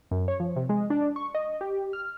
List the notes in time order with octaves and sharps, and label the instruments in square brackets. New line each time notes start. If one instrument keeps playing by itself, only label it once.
[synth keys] F#2
C#5
F3
C3
G#3
D4
C#6
D#5
G4
F6